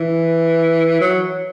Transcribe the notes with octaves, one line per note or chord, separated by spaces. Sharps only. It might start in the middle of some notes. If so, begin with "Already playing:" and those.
Already playing: E3
F#3